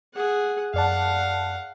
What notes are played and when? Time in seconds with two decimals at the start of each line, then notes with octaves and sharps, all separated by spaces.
0.14 G#4 F#5
0.74 F#2 D5 F5 F#5 A5